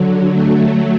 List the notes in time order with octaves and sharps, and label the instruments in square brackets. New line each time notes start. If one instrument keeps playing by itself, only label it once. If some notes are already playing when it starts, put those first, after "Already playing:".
Already playing: [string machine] D3 F#3
F#3 A3